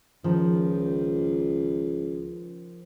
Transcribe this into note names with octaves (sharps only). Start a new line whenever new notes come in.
C#2 D#3 F3